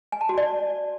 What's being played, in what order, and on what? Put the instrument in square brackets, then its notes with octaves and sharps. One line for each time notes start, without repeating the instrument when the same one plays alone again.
[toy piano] G#5
A5
F#4
D5